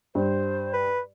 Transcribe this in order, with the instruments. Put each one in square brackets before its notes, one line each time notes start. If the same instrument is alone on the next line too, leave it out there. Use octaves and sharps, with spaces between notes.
[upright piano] G2 [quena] C5
[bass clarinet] B4